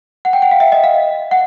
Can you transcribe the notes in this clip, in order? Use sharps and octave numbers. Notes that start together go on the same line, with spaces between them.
F#5
G5
F#5
F5
E5
D#5
F5
F#5